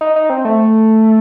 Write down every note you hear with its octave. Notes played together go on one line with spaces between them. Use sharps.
D#4
D#4
C4
A3